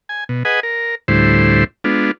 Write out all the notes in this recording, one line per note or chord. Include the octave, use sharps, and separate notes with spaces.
G#5
B2
G#4 B4 D#5 F#5 G#5
A#4
D2 A2 G3 E4 C5
G#3 B3 D4 F4